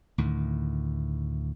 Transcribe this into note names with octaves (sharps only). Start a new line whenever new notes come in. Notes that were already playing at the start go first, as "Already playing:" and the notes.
D2 A2 D#3